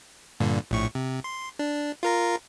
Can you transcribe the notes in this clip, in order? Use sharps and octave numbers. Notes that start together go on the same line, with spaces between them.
G2 A#2 D3
A#1 A2 C#6
C3
C6
D4
F4 A#4 A#5